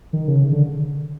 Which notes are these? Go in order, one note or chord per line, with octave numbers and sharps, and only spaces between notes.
D#3
C#3
D3